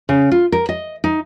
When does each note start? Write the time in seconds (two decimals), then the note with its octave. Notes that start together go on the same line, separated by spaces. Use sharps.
0.09 C#3
0.31 F4
0.52 A#4
0.69 D#5
1.04 D#4